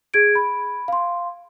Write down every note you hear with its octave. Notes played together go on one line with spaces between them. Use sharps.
G#4 G#6 D7
B5
F5 C6